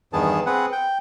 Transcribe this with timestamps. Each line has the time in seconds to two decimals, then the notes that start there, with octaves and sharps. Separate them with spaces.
0.13 E2 G2 D#3 B3 G#4 A5
0.46 C4 G#4 B4 F#5
0.72 G5